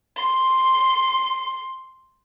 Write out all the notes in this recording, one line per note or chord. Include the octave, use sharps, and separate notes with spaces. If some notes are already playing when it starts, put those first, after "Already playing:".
C6 C7